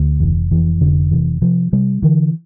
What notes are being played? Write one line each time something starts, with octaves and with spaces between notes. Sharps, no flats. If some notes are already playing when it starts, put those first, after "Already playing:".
Already playing: D2
F1 E3
F2 E3
F1 D3
C3 E3
C3 F3
C3 G3
D3 E3